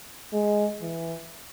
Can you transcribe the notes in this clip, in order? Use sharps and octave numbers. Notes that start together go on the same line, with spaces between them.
G#3
E3